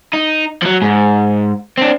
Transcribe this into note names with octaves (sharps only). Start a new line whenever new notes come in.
D#4
F3 F#3
G#2
C4 D4